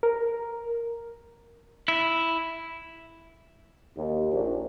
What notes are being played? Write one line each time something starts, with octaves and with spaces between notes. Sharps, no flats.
A#4
E4
D#2
A#1